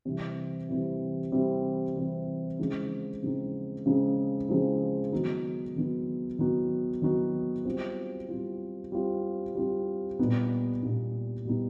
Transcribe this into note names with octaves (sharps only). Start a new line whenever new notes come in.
C3 E3 G3 C4 E4
C3 E3 G3 C4 E4
C3 E3 G3 C4 E4
C3 E3 G3 C4 E4
C#3 F3 G#3 C4 D#4
C#3 F3 G#3 C4 D#4
C#3 F3 G#3 C4 D#4
C#3 F3 G#3 C4 D#4
D#3 F#3 B3 D#4 F#4
D#3 F#3 B3 D#4 F#4
D#3 F#3 B3 D#4 F#4
D#3 F#3 B3 D#4 F#4
G3 C4 F4
G3 C4 F4
G3 C4 F4
G3 C4 F4
A#2 G3 B3 D#4
A#2 G3 B3 D#4
A#2 G3 B3 D#4